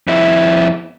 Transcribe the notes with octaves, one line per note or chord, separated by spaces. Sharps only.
F2 E4